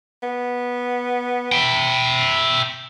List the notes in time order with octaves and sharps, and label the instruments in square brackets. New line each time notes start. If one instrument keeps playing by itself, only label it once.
[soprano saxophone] B3
[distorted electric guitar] E5 G5 [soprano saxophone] B5